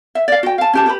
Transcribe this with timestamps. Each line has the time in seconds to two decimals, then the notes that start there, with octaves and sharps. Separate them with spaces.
0.15 E5
0.28 D5 F5
0.43 F#4 G5
0.58 F5 A5
0.73 C#4 G4 A5
0.86 G4 B4 B5